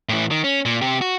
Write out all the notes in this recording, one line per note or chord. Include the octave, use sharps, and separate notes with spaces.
A2 E3
D#3
C#4
A#2
C3 G4
F#4